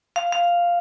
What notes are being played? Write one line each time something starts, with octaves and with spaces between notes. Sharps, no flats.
F5
F5